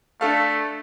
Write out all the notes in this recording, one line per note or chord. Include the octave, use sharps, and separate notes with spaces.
A3 D4 A4 F5